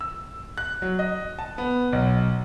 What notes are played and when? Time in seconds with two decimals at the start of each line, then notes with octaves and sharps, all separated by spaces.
0.01 E6
0.58 F#6
0.82 F#3
0.99 D#5
1.39 A5
1.58 B3
1.93 B1